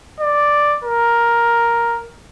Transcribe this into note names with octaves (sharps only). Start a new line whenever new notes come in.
D5
A#4